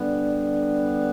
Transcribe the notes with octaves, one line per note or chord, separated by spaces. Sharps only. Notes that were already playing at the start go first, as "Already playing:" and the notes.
Already playing: D3 G3 B3 D4